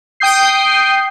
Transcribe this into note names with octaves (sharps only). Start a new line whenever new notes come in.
G5 D#6 G6 C7